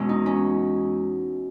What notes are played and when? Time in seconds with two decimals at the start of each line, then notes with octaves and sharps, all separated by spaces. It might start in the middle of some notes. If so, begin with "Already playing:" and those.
Already playing: E2 B2 G#3 C#4 F#4
0.09 D#4
0.26 C#4